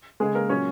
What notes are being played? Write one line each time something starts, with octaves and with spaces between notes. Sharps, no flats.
C#3 G#3 G#4
A#3 A#4
A#2 F#3 C#4 C#5